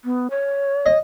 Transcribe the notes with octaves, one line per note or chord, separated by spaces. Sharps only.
B3
C#5
D#5